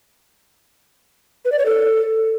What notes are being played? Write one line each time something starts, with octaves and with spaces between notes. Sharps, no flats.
B4
D5
C#5
A4